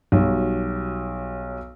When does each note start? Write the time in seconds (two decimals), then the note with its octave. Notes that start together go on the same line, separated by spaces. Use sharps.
0.12 B1 F#3 G3